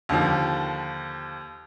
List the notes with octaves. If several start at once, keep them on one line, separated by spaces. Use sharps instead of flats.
D#2 D3 D#3 F3